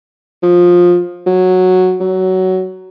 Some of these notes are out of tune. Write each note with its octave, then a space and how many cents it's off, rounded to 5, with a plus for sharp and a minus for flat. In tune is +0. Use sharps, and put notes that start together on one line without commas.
F3 +15
F#3 -5
F#3 +15